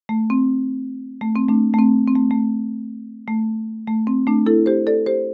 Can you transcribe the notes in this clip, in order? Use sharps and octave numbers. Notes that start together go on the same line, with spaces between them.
A3
C4
A3
C4
A3 D4
A3
C4
C4
A3
A3
A3
A3
C4
A3 D4
E4 A4
G4 C5
A4 D5
G4 C5